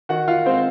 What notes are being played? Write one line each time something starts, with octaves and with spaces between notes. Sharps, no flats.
D#3 F#4 F#5
F4 F5
G#3 C4 C5